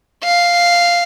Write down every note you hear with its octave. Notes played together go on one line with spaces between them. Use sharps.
F5